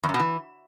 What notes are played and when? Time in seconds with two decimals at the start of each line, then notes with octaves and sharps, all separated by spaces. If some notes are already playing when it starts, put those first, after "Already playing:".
0.04 E2
0.09 F#2
0.14 B2
0.19 E3